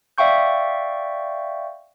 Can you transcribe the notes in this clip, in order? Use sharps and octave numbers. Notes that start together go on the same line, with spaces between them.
D5 E5 F5 G5 C#6 G6